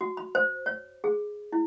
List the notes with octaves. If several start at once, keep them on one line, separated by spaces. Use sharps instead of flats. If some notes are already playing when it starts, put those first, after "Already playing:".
F#4
B5
C5
C#5
G#4
E4